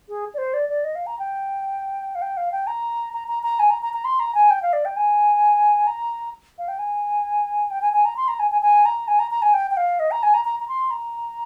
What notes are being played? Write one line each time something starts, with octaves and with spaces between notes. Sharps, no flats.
G#4
D5
C5
D5
D5
D#5
F5
A#5
G5
F5
G5
F5
G5
A#5
A#5
A#5
A#5
G#5
A#5
A#5
A#5
C6
A#5
G#5
G5
F5
D5
G5
G#5
A#5
F5
G5
G#5
G5
G#5
G#5
A#5
C6
A#5
G#5
G#5
G#5
A#5
G#5
A#5
A#5
G#5
G5
G5
F5
D#5
A#5
G#5
A#5
A#5
A#5
C6
A#5